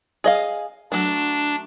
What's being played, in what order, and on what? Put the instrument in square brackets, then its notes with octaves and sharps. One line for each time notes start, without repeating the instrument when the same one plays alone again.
[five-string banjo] G#4 D#5 F5
[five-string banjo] F#3 A3 [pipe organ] D4